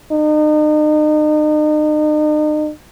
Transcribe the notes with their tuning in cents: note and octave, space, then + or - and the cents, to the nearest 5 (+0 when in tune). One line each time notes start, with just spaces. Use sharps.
D#4 -40